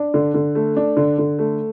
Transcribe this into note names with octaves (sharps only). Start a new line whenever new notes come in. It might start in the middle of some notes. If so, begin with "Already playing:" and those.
Already playing: D4
D3
D3
A3
D4
D3
D3
A3